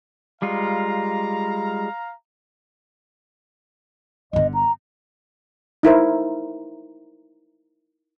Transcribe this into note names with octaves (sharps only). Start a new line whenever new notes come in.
G3 G#3 F4 F5 A#5
G1 D3 D#5
A#5
D#4 E4 A#4 C5